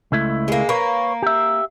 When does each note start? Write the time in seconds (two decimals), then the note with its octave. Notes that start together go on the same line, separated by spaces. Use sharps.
0.12 C#2 A3 E4
0.48 G#3 A#3
0.69 A#3 B4 C#5
1.23 G4 E5